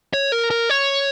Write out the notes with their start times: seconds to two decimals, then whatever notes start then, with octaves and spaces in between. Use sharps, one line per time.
0.14 C#5
0.32 A#4
0.51 A#4
0.69 C#5